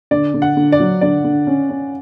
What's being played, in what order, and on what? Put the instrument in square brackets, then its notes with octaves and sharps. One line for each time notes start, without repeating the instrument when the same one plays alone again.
[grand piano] D3 [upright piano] D5
[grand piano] D3
[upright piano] F#5
[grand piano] D3
[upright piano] D5
[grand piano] F#3
[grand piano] D3 [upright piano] D5
[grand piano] D3
C#4
C#4